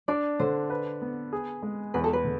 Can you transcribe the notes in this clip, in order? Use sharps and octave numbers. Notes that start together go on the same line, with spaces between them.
D4 D5
D3 C5
B4
B3
G#4
G#3
E2 B4
A4
B4
D3